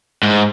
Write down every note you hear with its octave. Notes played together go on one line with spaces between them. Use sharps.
G#2